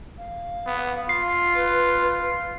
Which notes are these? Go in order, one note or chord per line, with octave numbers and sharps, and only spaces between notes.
F5
B3
F4 C7
B4